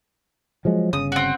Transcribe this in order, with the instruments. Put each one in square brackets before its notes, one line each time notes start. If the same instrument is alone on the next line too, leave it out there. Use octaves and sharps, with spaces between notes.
[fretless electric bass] F3 F#3 G#3
[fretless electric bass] G1 C#3 [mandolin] D#6
[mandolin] C4 F#4